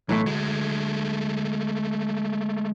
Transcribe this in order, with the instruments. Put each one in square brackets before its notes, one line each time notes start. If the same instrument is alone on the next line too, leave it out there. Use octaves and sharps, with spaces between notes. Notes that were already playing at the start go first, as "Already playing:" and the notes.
[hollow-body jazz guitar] B1 E3 A3 [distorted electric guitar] A2
[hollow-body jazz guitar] D2 [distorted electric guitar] G#3 A3